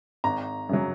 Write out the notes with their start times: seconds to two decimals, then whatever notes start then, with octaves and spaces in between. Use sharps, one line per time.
0.24 G#1 A#5
0.69 F#2 C#3 F#3